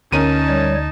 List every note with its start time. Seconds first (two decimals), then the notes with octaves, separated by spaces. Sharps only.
0.12 D2 C#4 D#4 A#4 A5 D#7
0.49 G3 C#5